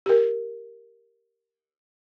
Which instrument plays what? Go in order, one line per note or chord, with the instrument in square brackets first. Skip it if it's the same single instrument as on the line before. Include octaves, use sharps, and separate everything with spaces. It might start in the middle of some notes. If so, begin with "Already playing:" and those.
[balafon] G4 A#4